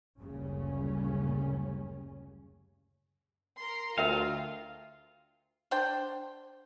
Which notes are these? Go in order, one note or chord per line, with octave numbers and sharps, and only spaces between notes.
F#1 D2 A#2 C#3 G3 C#4
A#4 A#5 C6
D2 F4 A#4 E5 F5 G5
D4 C5 G5